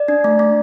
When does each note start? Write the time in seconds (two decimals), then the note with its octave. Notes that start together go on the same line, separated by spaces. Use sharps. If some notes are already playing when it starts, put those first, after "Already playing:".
Already playing: D5
0.08 D4
0.24 A3
0.39 A3